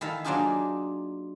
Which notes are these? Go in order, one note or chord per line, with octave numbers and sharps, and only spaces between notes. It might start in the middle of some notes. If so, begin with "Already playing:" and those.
D#3 E4 A4 F5
F#3 A#3 D4 D#4 F4 G#4